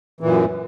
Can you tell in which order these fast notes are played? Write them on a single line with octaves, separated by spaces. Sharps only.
E3 A#2 F#2